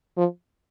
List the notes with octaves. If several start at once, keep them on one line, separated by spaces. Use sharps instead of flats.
F3